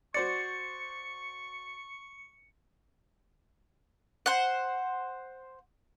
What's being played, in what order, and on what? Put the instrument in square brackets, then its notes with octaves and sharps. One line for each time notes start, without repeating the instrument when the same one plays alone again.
[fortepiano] F#4 C5 D5 [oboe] C#6 [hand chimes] A6 [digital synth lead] C#7
[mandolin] C5 F#5